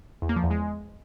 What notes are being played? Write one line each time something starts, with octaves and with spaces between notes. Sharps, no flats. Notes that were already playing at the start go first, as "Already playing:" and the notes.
E2
A#3
F3
E2
G#3